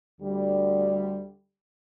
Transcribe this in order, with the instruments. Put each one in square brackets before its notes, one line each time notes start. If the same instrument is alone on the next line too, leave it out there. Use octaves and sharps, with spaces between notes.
[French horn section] D2 D3 G3